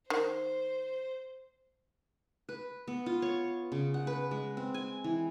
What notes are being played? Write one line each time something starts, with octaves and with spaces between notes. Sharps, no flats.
D#3 C5
B4
B3
F4
C#5
C#3
F#5
B4
G#3
C4
G#5
E3